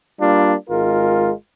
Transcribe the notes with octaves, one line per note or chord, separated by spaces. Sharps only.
G3 A#3 D4 F4
G#1 G#3 F4 A#4